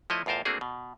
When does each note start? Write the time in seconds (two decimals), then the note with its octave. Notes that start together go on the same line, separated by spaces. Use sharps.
0.10 F3 A3 E4 C#5 D#5
0.26 E2 A2 F4 A#4 C5 F5
0.45 A3 A#3 C4 D4 F#4 G#4
0.61 B2